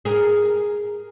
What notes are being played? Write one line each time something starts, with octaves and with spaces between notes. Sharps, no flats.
G#4 A#4